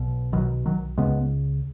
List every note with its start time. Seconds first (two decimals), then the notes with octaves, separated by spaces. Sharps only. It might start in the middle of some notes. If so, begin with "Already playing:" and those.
Already playing: B1 B2
0.33 B1 B2 D#3 F#3
0.66 D#3 F#3
0.98 C#2 C#3 G#3 B3